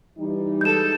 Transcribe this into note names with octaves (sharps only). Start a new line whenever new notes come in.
E3 G3 D#4
G#3 A4 G6 E7